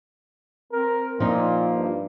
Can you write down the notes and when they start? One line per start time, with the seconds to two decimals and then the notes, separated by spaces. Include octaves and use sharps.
0.72 C4 A#4
1.20 A#2 F3 A#3 D#4
1.76 G2